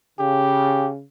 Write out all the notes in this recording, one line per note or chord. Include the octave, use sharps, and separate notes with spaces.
C#3 G4